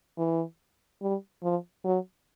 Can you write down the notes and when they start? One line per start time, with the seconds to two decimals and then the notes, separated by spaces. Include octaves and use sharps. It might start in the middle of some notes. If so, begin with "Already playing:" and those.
0.18 E3
1.02 G3
1.43 F3
1.85 F#3